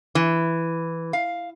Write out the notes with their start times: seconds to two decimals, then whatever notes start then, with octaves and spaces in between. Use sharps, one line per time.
0.15 E3
1.13 F5